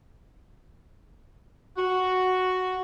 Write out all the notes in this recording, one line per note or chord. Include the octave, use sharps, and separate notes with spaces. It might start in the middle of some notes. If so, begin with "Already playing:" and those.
F#4